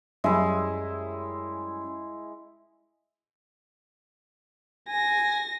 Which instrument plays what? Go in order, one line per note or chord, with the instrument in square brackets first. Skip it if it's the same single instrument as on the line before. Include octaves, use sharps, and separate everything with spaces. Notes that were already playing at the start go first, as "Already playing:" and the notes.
[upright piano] F#2 G3 E5 [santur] G#3 E4
[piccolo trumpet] G#5 [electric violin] A#6